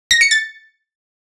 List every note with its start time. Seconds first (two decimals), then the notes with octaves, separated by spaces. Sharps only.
0.11 A#6
0.21 C#7
0.31 A6